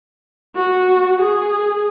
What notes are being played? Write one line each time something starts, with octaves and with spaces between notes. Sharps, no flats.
F#4
G#4